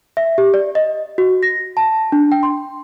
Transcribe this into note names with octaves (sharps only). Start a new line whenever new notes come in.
E5
G4
D5
D#5
F#4
A#6
A5
D4
G5
C6